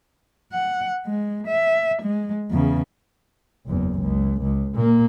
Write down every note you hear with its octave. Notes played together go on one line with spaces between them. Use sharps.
F#5
G#3
E5
G#3
E2 C#3
F#1 E2
C#2
C#2
A#2 A#3